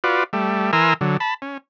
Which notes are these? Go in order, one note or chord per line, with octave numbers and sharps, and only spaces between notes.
F4 F#4 B4 D5
G3 A3
E3 A#4 G#5 A#5 C6 E6
D3 F#3
A5 B5
C#4